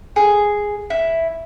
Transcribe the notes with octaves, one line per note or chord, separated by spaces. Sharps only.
G#4
E4